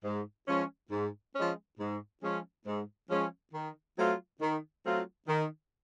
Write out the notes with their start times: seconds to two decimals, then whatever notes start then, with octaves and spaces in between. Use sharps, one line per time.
0.04 G#2
0.47 F3 G#3 C#4
0.91 G#2
1.35 F3 G#3 C#4
1.79 G#2
2.22 F3 G#3 C#4
2.66 G#2
3.10 F3 G#3 C#4
3.53 D#3
3.97 F#3 A3 C4 F4
4.40 D#3
4.84 F#3 A3 C4 F4
5.28 D#3